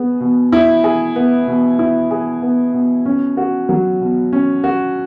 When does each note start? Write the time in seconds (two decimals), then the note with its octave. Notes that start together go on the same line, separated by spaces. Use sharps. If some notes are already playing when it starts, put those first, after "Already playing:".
Already playing: B3 G#4
0.20 B2
0.52 E4
0.84 G#4
1.16 B3
1.47 B2
1.79 E4
2.11 G#4
2.42 B3
2.74 B2
3.06 C#4
3.37 F#4
3.69 F#3
4.00 B2
4.33 C#4
4.64 F#4